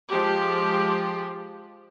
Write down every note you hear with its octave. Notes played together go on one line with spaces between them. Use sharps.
F3 G#3 G4